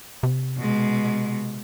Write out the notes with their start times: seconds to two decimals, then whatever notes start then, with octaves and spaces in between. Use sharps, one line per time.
0.23 C3
0.57 B2 G#3